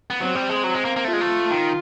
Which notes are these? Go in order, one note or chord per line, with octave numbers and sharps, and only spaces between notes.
B3
F#3 C4
G3
G#3
F#3
G#3
A#3
A#3
A3 F4
G#3
A3
D#3